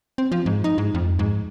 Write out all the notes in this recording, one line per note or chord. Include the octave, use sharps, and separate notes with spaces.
C4
F3
G#2
D#4
G#2
F2
G#2